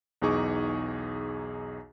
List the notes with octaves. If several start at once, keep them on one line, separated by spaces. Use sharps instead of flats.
B1 E2 D#4 G#4 C#6 D6